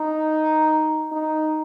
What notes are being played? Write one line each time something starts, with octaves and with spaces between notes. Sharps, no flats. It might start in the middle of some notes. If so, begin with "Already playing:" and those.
Already playing: D#4
D#4